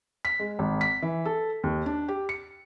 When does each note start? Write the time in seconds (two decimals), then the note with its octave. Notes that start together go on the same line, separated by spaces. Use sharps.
0.25 B6
0.39 G#3
0.59 G#1
0.81 B6
1.02 E3
1.26 A4
1.63 D#2
1.86 D4
2.08 G4
2.29 C#7